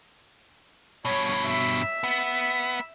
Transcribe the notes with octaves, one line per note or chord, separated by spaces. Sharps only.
G2 B2 C#5
E5
B3